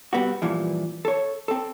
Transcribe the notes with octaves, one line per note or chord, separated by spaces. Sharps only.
G3 B3 C4 F#4
G2 A#2 E3 F3
A4 C#5
C4 A4